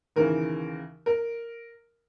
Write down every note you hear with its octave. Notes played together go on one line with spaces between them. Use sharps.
D#2 C#3 E3 A#4
A#4